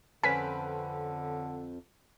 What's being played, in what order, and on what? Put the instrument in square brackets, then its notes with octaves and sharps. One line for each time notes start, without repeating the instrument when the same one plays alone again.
[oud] F2 C4 [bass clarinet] D3 [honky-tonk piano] C#4 B4 [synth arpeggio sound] G#5 B6